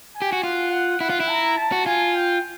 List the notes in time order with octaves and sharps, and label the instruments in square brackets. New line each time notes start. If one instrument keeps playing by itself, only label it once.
[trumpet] G#5
[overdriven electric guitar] G4
F#4
[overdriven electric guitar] F4 [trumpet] F#5
[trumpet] F#5
[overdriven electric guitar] E4 [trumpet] F#5
[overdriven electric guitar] F4
E4
[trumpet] A#5
A5
[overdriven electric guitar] F#4
[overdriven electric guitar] F4 [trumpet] G#5
[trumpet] G5